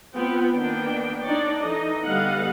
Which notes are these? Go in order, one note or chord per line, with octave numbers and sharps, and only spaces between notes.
B3 C4 F4 G5
D#3 A#3 B3 D4 G5
D4 D#4 C#5 D5
E3 D#4 A4 D#5
D3 G3 B3 D#5 F5 F#5